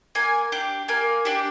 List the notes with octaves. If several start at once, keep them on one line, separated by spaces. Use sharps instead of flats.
A#3 G#5
D4 G4
A#3 G#5
D4 G4